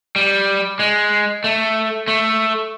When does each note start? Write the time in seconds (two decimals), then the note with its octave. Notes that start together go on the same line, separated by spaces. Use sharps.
0.16 G3
0.79 G#3
1.44 A3
2.08 A3